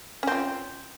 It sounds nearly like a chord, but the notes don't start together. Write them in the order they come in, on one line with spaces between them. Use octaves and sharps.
C#4 C4 F4